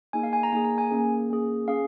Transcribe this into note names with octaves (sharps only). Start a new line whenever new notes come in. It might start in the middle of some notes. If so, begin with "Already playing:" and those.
A#3 D#4 G#4 G#5
F5
G#5
A#5
A#3 D#4 G#4 G#5
A#5
G#5
A#3 C#4 G#4
A#3 C#4 G#4
C#4 G#4 F5